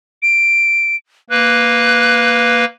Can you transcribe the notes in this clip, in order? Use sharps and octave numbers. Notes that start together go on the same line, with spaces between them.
D7
A#3 B4 F#6